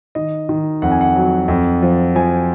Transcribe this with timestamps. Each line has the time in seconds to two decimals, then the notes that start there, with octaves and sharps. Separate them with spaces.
0.15 D#3 D#5
0.49 D#3
0.82 F2 F#5
0.92 G#5
1.01 F#5
1.16 F#3
1.48 F2
1.82 F3
2.15 F3 G#5